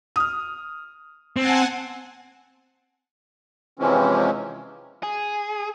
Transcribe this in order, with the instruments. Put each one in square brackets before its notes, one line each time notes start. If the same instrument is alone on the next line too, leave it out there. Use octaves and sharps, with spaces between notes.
[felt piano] D#6 F6
[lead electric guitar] C4 [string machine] F#5 G#5 A5
[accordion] C3 E3 F3 G#3 C4 C#4
[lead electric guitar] G#4